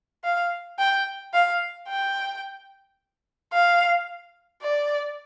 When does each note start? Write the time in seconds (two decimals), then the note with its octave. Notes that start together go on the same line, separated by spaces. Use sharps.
0.24 F5
0.79 G5
1.34 F5
1.88 G5
3.53 F5
4.62 D5